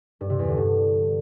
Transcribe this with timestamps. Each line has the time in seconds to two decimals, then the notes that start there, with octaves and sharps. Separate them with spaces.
0.21 G2
0.30 C3
0.39 E2
0.48 D3
0.57 G2